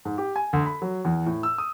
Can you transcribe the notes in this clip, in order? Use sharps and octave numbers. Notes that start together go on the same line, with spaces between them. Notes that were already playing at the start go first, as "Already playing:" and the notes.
G#2
G4
G#5
D2
B5
F#3
E2
A2
E6
D#6